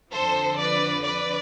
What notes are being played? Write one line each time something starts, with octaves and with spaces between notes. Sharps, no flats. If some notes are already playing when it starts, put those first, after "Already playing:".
F2 D3 F3 A4 C5
B4 D5
B4 D5